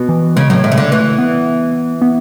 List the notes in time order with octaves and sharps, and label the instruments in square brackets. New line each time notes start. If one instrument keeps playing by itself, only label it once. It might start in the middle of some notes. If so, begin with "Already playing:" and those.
Already playing: [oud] B2
[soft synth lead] E3
[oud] C#3 [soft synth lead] G#3
[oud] A2 [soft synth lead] F#3
[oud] A2 [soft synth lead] G#3
[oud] C#3
D3
[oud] E3 [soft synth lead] A3
[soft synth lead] B3
B3